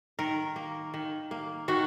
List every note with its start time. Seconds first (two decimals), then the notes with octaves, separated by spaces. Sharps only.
0.19 D#3 A#4
0.56 A#3
0.94 D#3
1.31 A#3
1.68 D#3 F#4